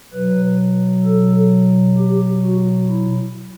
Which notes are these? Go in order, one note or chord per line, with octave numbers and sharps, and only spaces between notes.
B2 F#3 B4
A4
G4
F#4
E4